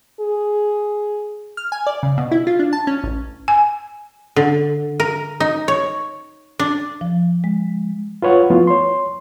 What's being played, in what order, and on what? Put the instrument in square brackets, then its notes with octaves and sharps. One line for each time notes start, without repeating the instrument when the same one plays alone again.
[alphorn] G#4
[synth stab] F6
G#5
D5
C#3
B2
E4
F4
D4
A5
C#4
A1
[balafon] G#5
[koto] D3
A#4
D#4
C#5
D4
[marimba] F3
G#3
[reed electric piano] F4 B4 C#5 F#5
F3 A3 B3 E4 F4
C#5 C6